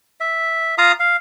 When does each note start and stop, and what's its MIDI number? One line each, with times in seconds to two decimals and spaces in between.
0.20 0.75 76
0.78 0.92 65
0.78 0.92 77
0.78 0.92 82
0.78 0.92 87
1.00 1.16 77